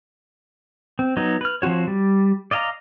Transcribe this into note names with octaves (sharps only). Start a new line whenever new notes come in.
C4
F#3 B3 D#4
B4 F6
F3 C4 F4 F#4 C#5
G3
D5 D#5 F5 G#5 A#5